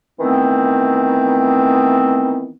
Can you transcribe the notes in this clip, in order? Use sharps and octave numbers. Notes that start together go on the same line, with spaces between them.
D#3 E3 A3 B3 C4